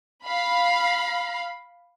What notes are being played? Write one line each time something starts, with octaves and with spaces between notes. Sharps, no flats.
F5 B5